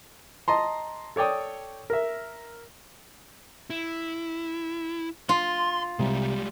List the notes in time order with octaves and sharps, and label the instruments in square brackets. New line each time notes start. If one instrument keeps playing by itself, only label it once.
[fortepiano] D#5 A5 A#5 C6
A4 C#5 D5 G5 D#6
A#4 E5
[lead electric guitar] E4
[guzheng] F4 [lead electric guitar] C6
[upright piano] C2 [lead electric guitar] G3 G#3